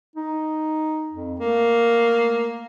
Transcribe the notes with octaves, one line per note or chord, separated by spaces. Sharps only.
D#4
F2
A3 A#3